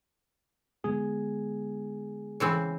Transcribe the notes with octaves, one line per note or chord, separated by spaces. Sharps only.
D3 G#3 B3 G#4
C#3 E3 C4